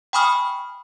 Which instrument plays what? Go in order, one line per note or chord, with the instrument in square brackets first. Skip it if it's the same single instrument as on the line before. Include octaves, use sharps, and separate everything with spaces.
[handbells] G5 G#5 B5 C#6 D#6 F6